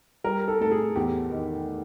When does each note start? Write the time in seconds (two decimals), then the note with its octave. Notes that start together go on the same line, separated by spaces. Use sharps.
0.24 G3 A#4
0.48 A4
0.60 A2 A4
0.71 G#4
0.96 E2 G4
1.31 D#3